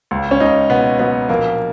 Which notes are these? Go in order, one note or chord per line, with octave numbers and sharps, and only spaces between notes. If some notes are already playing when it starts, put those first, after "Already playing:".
C#2
C#4
C#2 D#4
B2 B3
F#3 B3
A#1 A#3